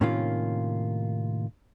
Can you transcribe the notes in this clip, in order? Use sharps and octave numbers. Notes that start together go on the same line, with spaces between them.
A2 C3 D#3 A#3 C#4 F4